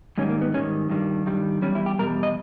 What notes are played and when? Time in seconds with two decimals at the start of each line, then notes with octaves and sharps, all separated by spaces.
0.18 G#2 D#3 G3 C#4
0.29 A#3
0.42 B3
0.54 G#2 D#3 G3 C#4
0.90 G2 D#3 G3
1.26 G2 D#3 G3
1.62 E2 B2 G3 C#4
1.75 E4
1.86 G4
1.99 E2 B2 G3 A#4
2.23 D#5